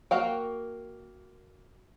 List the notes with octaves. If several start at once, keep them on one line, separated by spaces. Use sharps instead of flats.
A#3 F#4 F5 G5